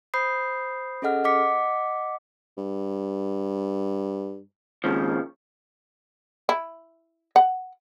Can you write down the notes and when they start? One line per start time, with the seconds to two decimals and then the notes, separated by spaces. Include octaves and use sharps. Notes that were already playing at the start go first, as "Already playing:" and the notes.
0.14 C5 B5 D#6 G6 C7
1.02 C#4 G#4 A4 D#5 F#5 F6
1.24 D#5 F#5 D6 B6 C#7
2.58 G2
4.84 G#1 D#2 C#3 F3
6.49 E4
7.36 F#5